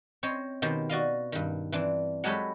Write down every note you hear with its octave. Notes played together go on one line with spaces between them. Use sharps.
C4 C5 C#5 D#5
B2 D#3 G4 C5
F#4 D5 D#5 F5
G2 D#3
E3 C4 D4
F#3 G#3 G4 A4 B4 C#5